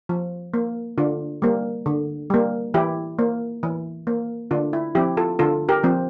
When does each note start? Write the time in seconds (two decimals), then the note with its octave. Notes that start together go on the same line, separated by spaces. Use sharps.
0.09 F3
0.54 A#3
0.98 D3 D4 F4
1.42 G3 A#3
1.86 D3
2.30 G3 A#3
2.74 E3 E4 G4
3.19 A#3
3.63 E3
4.07 A#3
4.51 D3 D4 F4
4.73 E4
4.95 F3 C4 E4 G4
5.17 F4 A4
5.39 D3 F4 A4
5.69 G4 A#4
5.83 F3 C4